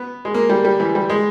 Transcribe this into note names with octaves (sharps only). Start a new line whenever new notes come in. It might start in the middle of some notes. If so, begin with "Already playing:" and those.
Already playing: B3
G#3
A#3
G3
G3
E3
G3
G#3